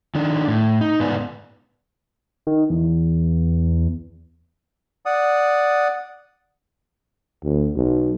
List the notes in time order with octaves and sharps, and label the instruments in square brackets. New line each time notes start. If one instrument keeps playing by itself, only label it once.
[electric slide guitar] D#3 D4
A2
D#4
G#2 B3 B4 D5
[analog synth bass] D#3
E2
[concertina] D5 F#5 D#6
[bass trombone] D2
B1